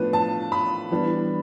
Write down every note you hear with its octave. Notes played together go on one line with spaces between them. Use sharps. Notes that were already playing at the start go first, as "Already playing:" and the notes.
Already playing: A2 F3 B3 D4 B4
A5
B5
E3 G3 B3 D4